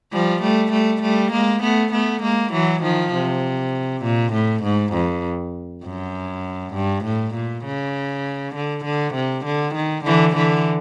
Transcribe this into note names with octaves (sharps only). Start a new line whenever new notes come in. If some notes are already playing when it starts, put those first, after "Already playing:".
F3 G3
G3 A3
G3 A3
G3 A3
G#3 A#3
A3 B3
A3 B3
G#3 A#3
E3 F#3
D#3 F3
C3
A#2
A2
G#2
F2
F#2
G2
A2
A#2
C#3
D3
D3
C3
D3
D#3
D3 E3
D3 E3